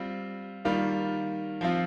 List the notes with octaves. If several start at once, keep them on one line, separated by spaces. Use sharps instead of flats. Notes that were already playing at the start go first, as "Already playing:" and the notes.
Already playing: G3 C4 F4
D#3 G3 A#3 F4
F3 C4 F4